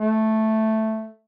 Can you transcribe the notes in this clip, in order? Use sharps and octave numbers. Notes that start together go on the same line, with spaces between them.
A3